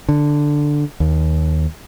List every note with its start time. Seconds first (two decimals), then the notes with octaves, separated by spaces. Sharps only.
0.09 D3
1.00 D#2